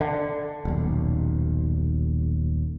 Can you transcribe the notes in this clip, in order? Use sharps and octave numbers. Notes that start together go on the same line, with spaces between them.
D3
D#1 B1